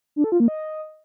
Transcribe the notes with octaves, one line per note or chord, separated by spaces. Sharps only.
D4
A4
F4
A#3
D#5